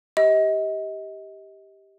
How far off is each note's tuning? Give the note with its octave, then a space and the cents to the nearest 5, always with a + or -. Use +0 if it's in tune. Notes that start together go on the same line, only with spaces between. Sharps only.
G4 +0 D#5 +35